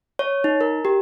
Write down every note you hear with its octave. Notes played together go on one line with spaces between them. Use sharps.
C#5
D#4
A#4
G4